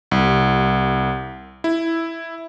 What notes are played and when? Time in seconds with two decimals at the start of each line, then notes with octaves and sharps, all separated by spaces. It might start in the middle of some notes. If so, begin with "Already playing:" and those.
0.11 C2
1.64 E4